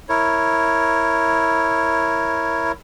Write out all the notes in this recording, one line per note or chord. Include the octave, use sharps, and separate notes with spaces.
E4 A#4 C#5